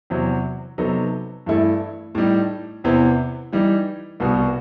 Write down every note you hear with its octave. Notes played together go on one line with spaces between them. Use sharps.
E2 C3 F#3
C3 F#3 B3 D#4 A4
G2 E3 A3 E4 A4
A2 G3 D#4
E2 C3 E3 B3
E3 G3 D#4
C2 B2 G3 B3 F#4